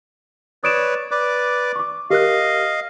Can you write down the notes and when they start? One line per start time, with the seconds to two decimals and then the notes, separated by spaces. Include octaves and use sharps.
0.64 B4 C#5 D5 D#6 D7 E7
1.11 B4 D5 D6
1.76 C#6 D6
2.10 G4 A#4 D#5 F5 F#6